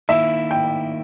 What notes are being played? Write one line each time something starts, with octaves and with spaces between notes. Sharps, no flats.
D#3 A#3 E4 E5
G5